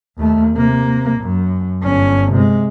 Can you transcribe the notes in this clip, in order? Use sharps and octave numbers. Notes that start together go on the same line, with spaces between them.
D#2 A3
C3 A#3
F#2
G1 C#4
C3 G#3